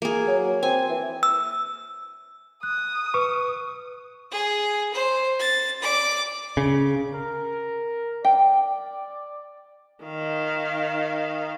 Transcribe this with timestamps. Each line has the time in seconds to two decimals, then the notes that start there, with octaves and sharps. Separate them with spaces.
0.02 A#3 G#4
0.27 F#3
0.63 C4 G#5
0.89 E3
1.23 E6
2.63 D#6 F#6
3.14 B4 C#6
4.31 G#4
4.93 C5
5.40 A6
5.82 D5 D6
6.57 C#3
7.15 A#4
8.25 D5 G5
10.05 D#3 F5